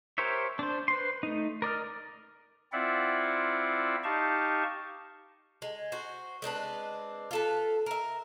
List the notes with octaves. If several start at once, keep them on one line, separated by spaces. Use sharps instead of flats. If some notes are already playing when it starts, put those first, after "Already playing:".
G4 A#4 C5 C#5 E5
D4 C5
B4 C5 C6
A3 D#4
A#4 D5 D#5 F6
C4 E4 F4 D5 E5 F#5
D#4 G4 F5 A5 C#6
G#3
F#4 C5
G#3 C4 D4 B4
F4 A4 B4
A#4 E5